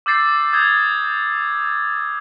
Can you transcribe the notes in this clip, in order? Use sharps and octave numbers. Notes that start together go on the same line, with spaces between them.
D6 E6 G6 A6 C7
D#6 G6 G#6 G7